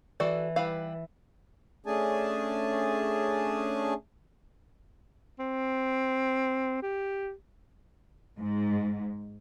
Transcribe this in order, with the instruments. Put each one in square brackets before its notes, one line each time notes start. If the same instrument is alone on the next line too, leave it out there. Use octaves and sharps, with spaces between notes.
[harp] E3 [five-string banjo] F#4 A4 D5
[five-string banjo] G3 B4 F5 [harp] E4
[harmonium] A3 C#4 D4 G#4 G#5 A5
[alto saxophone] C4
G4
[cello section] G#2